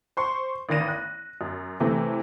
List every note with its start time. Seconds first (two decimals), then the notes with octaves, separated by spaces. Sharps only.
0.17 C5 C6 C#6
0.69 A1 D#3 D5 A#6 D#7
0.88 F#6
1.41 F#2
1.80 C3 E3 A3